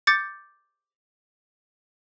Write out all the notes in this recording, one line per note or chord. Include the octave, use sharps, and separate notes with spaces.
D6 G6 A6 C#7